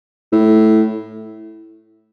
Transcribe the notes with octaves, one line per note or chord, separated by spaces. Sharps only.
A2